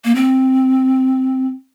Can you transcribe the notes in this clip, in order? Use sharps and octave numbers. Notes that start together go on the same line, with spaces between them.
A#3
C4